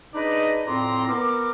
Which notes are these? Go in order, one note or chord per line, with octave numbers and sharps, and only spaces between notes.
D4 D#4 G#4 B4 D5 D#5
F2 A2 C4 D5 A#5 C6
B3 A#4 D6